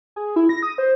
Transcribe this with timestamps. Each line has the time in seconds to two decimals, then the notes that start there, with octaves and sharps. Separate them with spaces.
0.16 G#4
0.36 E4
0.49 A#6
0.63 D#6
0.78 C5